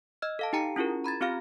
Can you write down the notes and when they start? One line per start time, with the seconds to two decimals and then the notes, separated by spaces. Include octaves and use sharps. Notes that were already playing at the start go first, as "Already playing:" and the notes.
0.22 D#5 E6 F6
0.39 A4 F5 A5
0.53 D#4 G4 G5 A#5 C#7
0.76 C#4 E4 F4 G#4 A#4
1.04 A#5 B5 G#6 A6
1.21 C4 F4 G4 F5 F6